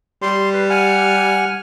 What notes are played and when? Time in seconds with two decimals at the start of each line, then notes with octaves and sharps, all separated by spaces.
0.22 G3 C6
0.53 B4
0.70 F#5 G#5 F6